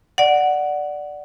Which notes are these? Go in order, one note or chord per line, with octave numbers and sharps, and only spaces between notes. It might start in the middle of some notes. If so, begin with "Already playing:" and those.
D5 F#5